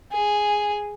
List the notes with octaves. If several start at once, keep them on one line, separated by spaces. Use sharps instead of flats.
G#4